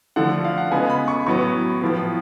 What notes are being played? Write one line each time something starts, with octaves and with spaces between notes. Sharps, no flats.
D3 F3 A3 F#5
F5
F#5
C#3 G#3 B3 G#5
B5
C#6
A2 F#3 B3 C#6
A2 F3 B3